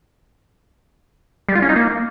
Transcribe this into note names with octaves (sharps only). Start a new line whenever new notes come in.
G3
F4
C#4
D#4
A#3